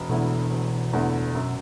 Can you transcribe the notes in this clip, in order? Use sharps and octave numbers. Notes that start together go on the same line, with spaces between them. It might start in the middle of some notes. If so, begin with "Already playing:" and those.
Already playing: E1
E2 B2 D3 A3 E4
E1
E2 D3 A3 E4
F#2